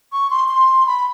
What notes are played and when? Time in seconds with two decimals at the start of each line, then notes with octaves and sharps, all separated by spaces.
0.13 C#6
0.30 C6
0.48 C6
0.86 B5